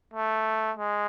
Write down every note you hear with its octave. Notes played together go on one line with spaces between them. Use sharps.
A3
G#3